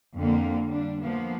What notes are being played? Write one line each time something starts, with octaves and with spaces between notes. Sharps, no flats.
F2 D3 A#3
G3 D4
F3 A#3 B3